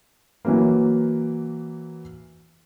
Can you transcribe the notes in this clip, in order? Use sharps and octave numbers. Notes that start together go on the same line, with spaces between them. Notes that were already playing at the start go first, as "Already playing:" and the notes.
E3 F#3 A#3